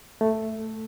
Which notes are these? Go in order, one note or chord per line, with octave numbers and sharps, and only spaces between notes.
A3